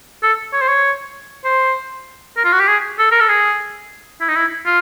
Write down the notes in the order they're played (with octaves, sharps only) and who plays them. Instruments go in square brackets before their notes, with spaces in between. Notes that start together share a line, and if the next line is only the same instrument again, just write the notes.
[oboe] A4
C#5
C5
C#5
C5
A#4
F4
F#4
G4
G#4
A4
A#4
A4
G#4
E4
D#4
E4
F4